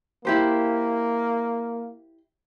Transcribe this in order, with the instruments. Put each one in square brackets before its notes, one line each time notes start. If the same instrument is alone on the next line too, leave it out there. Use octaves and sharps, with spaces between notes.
[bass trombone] A#3 [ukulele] E4 G4 C5